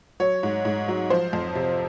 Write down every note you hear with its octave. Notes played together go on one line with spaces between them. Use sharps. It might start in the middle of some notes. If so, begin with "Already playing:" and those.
F#3 C#5
G#2
G#2
F#3
F3 C5
F2
C3